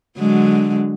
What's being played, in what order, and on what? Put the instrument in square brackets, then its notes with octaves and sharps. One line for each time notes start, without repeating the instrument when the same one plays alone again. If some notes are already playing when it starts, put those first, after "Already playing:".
[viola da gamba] D3 F#3 G#3